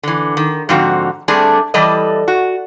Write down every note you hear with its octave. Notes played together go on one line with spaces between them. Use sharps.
D3 E3
D#3
G#2 D3 F3 C4 F#4
G3 A3 C4 D4 G#4
E3 G3 A4 D5 D#5
F#4